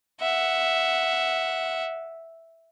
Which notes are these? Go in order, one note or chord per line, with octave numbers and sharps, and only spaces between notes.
E5 F#5